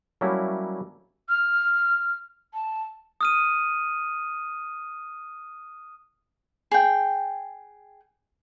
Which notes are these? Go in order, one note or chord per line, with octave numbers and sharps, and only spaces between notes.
F#3 G3 A3 A#3 C#4 E4
F6
A5
D#6 F6 D#7
G#4 G5